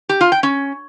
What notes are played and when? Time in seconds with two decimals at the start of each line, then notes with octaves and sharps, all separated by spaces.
0.09 G4
0.21 F4
0.32 G5
0.43 C#4